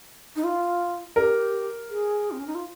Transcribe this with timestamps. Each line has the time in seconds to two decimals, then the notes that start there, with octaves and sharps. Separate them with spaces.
0.36 D#4
0.44 F4
1.16 G4 A#4
1.89 G#4
2.31 C4
2.39 C#4
2.47 D#4
2.55 F4